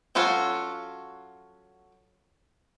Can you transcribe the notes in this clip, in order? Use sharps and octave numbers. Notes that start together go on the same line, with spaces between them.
F#3 C#4 F4 F#4 A4